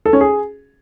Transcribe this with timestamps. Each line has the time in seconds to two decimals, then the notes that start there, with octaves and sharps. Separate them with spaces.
0.06 A4
0.13 C#4
0.21 G#4